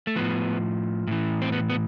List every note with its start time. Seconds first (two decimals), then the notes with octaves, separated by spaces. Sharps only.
0.07 A3
0.16 A2 F3 B3
1.07 A2 E3
1.42 C4
1.52 B3
1.70 B3